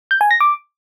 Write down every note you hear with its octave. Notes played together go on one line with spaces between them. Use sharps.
G6
G#5
A#6
D6